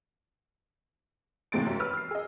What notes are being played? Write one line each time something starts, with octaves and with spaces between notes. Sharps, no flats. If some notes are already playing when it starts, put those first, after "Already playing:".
D#2 A2 C3 G#3 A6 D7
F#2
B4 E6 F6
E6 C7
G#4 D#5